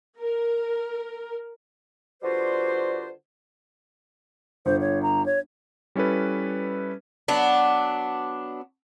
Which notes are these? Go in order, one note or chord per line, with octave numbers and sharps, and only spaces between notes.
A#4
D3 G3 F4 F#4 B4 C5
G1 C5
C#5
A#5
C#5
G3 C#4 E4 A4 B4
F#3 B3 D4